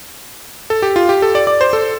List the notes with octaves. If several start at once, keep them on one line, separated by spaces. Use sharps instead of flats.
A4
G4
F4
G4
A4
D5
D5
C5
A4